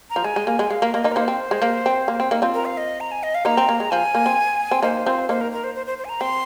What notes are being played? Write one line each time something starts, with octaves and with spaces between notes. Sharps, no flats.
A#5
F3
G#3 G#5
G#3
A#3
G#3
G#3 F5
A#3
A#3 D#5
A#3 D#4
A#4
A#3 D#4 C5
C4
G#3
A#3
C4
A#3
C4
A#3 D#4
C4 F4
A#4
F5
D#5
A#5
G#5
D#5
F5
A#3 D#4 A#5
C4
A#3
G#3
F3 G#5
A#3
C4
C4
A#3 D#4 C5
C4 F4
A#3 D#4 C5
A#4
A#4
C5
C5
C5
C5
G#5
A#5
C4 C6